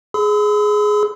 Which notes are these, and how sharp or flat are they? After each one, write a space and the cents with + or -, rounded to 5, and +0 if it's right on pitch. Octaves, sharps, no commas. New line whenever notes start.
G#4 +10 B5 +45 E6 -40